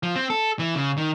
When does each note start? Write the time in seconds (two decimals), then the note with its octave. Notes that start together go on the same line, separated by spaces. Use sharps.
0.03 F3
0.16 C4
0.30 A4
0.59 E3
0.75 C#3
0.97 D#3